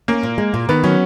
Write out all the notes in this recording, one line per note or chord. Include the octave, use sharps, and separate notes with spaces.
A#3 C#4
A#2
G#3
A#2
D#3 B3
F#3 C#4